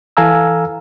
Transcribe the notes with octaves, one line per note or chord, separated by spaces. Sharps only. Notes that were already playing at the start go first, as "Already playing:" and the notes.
E3 A4 F5 G#5 A#5 E6